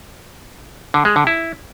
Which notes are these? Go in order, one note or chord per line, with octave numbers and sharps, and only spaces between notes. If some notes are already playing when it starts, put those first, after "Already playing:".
D3
G#3
D3
E4